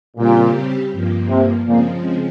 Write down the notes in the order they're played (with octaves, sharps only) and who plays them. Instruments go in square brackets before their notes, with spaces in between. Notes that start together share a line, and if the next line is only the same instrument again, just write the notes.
[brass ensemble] A#2 [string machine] C#3 G3 C4 G4
[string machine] G2 F3 A#3
[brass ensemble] C3
[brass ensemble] A#2 [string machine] C#3 F3 G#3 C4